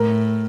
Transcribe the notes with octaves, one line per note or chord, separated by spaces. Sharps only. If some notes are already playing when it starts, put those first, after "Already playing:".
Already playing: A2 A#4